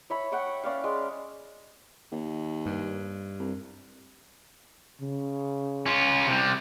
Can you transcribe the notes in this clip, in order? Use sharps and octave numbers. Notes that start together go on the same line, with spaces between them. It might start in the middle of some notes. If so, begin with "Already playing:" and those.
C#5 E5 B5
F#5 G5 C#6
C#4 D5 F5
G#3
D#2
G2
C2
C#3
C#4 F4
C3 G3